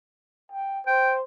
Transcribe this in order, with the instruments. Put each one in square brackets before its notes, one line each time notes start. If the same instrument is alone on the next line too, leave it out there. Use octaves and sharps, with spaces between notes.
[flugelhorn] G5
[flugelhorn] C5 [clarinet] G5